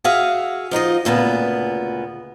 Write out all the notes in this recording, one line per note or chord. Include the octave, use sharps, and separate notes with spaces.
F#4 G#4 E5 F5
F3 D#4 F4 D#5
D2 A#2 C#3 B3